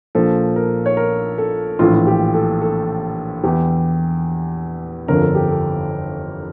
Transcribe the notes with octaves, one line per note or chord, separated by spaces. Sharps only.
A#1 A#2 F3 A4
A#4
C#5
A#4
A4
A#1 A2 E3 F4
F4
G4
A4
A4
E2 E3 G4
G1 F2 D3 F3 A#4
A4
G4
A4